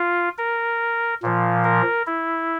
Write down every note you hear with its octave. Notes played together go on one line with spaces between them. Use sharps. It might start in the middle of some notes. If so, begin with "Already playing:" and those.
Already playing: F4
A#4
A#2 F3
A#4
E4